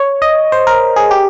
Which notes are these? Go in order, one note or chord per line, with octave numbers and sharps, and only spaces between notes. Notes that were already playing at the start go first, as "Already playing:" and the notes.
Already playing: C#5
D#5
C5
A#4
G#4
G4